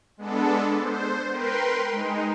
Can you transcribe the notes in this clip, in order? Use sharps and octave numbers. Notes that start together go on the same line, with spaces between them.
G#3 B3 D4 A4
C5
A#4 B4 G5 C6
G#3 D#4